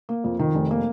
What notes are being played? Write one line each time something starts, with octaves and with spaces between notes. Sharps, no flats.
A#3
F2
D#3
F1
A#3